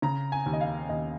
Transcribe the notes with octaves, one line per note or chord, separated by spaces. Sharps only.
C#3 A#5
G#5
D#2
D#5
F5
D#2 D#5